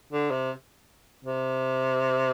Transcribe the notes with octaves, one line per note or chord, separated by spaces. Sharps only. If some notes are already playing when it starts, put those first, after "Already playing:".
D3
C3
C3